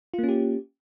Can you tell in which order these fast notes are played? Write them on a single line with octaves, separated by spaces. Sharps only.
F4 A#3 C#4 G4